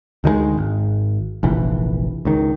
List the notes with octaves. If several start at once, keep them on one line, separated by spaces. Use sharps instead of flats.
D2 D#3 E3 G#3
G#1
F1 A#1 E3
C#2 D#3